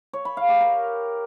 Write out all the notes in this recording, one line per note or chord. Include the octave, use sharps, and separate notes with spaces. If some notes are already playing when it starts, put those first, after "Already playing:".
C#5
B5
F5
G4
A#4